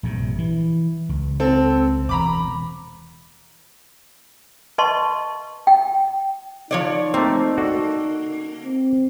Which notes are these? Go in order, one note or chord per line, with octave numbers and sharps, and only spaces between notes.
A#1 G2 C3
E3
C#2
C4 A4
E1 A#5 B5 D6
B4 D#5 A5 C6 C#6
G5
F3 D#4 C#5 D5
A3 A#3 C4
F#4 A4 D5
C4